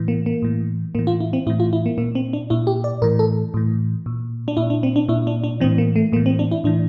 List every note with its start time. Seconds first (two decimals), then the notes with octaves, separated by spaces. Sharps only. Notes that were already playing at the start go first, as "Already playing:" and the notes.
Already playing: A2 E3
0.08 A#3
0.26 A#3
0.42 A2 E3
0.95 A2 E3 A#3
1.07 F4
1.20 E4
1.33 C4
1.47 A2 E4
1.50 E3
1.60 F4
1.73 E4
1.86 A#3
1.98 A#2 A#3
2.15 C4
2.33 D4
2.50 A#2 E4
2.67 G4
2.84 D5
3.02 A2 E3 A#4
3.19 A4
3.54 A2 E3
4.06 A#2
4.48 D4
4.57 A#2 E4
4.70 D4
4.83 C4
4.96 D4
5.08 A#2 E4
5.27 D4
5.44 D4
5.60 A2 E3 C4
5.78 A#3
5.96 A3
6.12 A2 A#3
6.16 E3
6.26 C4
6.39 D4
6.51 E4
6.64 A2 E3 D4